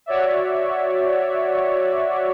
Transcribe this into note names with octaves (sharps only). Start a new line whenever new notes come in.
F#4 C#5 D5 E5